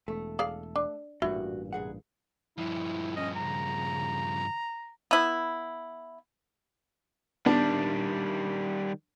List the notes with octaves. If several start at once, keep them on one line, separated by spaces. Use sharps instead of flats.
E1 A3
G#4 D5 F5
D4
A1 G2 A#2 E4 F#4
C2 G#4 F#5
G2 F3 E4
C#4 D#5
C#3 A#5
B3 E4
D#3 G3 B3 D4